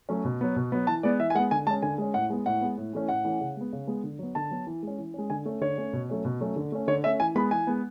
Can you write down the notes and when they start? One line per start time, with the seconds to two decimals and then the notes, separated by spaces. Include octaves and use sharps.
0.09 F#3 A3 C#4
0.25 B2
0.41 F#3 B3
0.56 B2
0.72 F#3 B3
0.87 E3 A5
1.03 G#3 B3 D5
1.20 E3 E5
1.30 G#5
1.35 G#3 F#5
1.39 B3
1.51 D3 G#5
1.67 G#3 A5
1.71 C#4
1.82 D3 G#5
1.98 G#3 C#4
2.14 A2 F#5
2.30 G#3 B3
2.46 A2 F#5
2.61 G#3 B3
2.77 A2
2.93 E3 A3 C#4
3.09 A2 F#5
3.25 E3 A3 C#4
3.41 C#3
3.56 G#3 B3
3.72 C#3
3.87 G#3 B3
4.04 D3
4.19 F#3 B3
4.35 D3 A5
4.51 F#3 B3
4.67 E3
4.83 G#3 C#4
4.98 E3
5.14 G#3 C#4
5.30 D3 G#5
5.46 A3 C#4
5.61 D3 C#5
5.78 A3 C#4
5.93 B2
6.10 F#3 A3 C#4
6.25 B2
6.41 F#3 A3 C#4
6.56 D3
6.72 A3 C#4
6.88 D3 C#5
7.04 A3 C#4 E5
7.20 E3 G#5
7.35 G#3 B3 B5
7.51 E3 G#5
7.67 G#3 B3